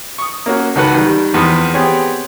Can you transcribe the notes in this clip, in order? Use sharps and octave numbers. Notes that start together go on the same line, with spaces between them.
C#6 D#6
A#3 C#4 F#4
C#2 D#3 F#4 A4 B4 F#5
D#3 G3
E2 F3 B3 C4
B3 C4 G4 G#4 C#5